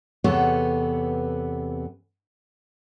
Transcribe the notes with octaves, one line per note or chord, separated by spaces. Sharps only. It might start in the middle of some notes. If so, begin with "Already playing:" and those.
E2 C3 B3 A4 C#5